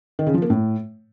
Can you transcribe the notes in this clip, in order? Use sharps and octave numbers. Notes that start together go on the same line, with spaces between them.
D#3
C#3
F3
A#3
A2